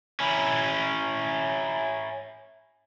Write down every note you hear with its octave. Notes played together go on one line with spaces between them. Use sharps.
C#4 E4